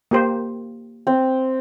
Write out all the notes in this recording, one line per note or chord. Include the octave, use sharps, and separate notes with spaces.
A#3 G4 C5
C4